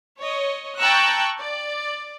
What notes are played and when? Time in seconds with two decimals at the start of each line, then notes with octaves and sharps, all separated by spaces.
0.19 C#5 D#5
0.78 G5 A5 A#5 C#6 E6 F#6
1.37 D5